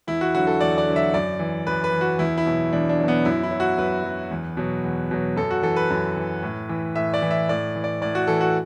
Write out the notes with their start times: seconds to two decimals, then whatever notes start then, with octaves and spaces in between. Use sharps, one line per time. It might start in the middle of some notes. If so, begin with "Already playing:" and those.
0.07 E2 E4
0.21 F#4
0.35 D3 F#3 F#4
0.47 A4
0.61 E2 D5
0.78 D5
0.86 D3 F#3
0.96 E5
1.14 F#2 D5
1.39 E3
1.67 F#2 B4
1.84 B4
1.93 E3
2.01 F#4
2.19 E2 E4
2.38 E4
2.46 B2 F#3
2.73 E2 D4
2.89 D4
2.99 B2 F#3
3.08 B3
3.25 F#2 E4
3.43 E4
3.51 F#3
3.60 F#4
3.77 F#2 B4
4.04 F#3
4.31 E2
4.57 B2 F#3
4.84 E2
5.11 B2 F#3
5.36 F#2 A4
5.51 F#4
5.63 E3 A4
5.76 B4
5.90 F#2
6.17 E3
6.43 A2
6.69 E3
6.96 A2 E5
7.14 D5
7.22 E3
7.31 E5
7.49 A2 D5
7.76 E3
7.84 D5
8.01 A2 D5
8.15 F#4
8.27 E3 A4
8.41 F#4